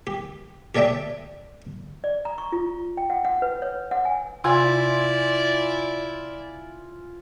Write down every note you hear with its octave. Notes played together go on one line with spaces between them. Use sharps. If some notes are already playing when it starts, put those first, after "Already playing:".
G4
G4 A4 C#5 D5 E5 G5
D5
A#5
C#6
F4
G5
F#5
F#5
B4
C#5
F#5
G#5
C3 E4 F4 D5 E5 G#5